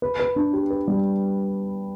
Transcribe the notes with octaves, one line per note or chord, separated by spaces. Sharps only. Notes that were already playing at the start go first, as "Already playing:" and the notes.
B4
B4
D4
G4
B4
G3